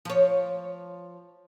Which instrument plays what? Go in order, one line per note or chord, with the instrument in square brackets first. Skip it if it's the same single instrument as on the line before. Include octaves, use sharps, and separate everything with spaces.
[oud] F3 C#5